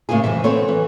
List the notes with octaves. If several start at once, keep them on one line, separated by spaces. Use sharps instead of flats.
A2 C#3 A#3 E4 G#4
F#2 C3 E3 E5
B3 C4 A4 C#5
E3